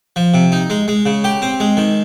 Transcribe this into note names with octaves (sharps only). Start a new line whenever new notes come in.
F3
C3
D#4
G#3
G#3
C#3
G4
C4
G#3
D#3